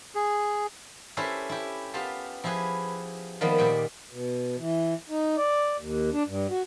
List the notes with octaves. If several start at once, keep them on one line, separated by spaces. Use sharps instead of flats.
G#4
C#4 E4 G4 A4 B4 C5
E4 G4
B3 F4 G4 F5 A5
F3 E4 G4 G#4 B4
D#3 F3 G3 A#3 B3 B4
A#2 G4 F#5 G5
B2
E3
D#4
D5
D#2
D4
G2
F#4